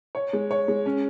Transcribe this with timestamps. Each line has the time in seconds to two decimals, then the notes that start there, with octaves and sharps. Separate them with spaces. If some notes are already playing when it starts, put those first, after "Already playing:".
0.15 C#5
0.33 G#3
0.51 C#5
0.68 G#3
0.86 C#4